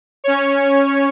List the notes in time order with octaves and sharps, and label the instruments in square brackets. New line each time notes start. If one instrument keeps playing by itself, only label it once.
[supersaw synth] C#4 C#5